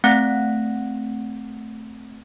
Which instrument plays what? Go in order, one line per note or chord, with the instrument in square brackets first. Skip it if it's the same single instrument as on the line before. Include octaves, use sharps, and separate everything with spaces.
[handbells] A3 C4 F#5 F#6 A#6